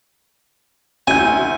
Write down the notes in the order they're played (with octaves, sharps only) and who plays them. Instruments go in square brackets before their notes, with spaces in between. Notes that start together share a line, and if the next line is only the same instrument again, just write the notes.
[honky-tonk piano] D2 E4 G6 [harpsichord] G#5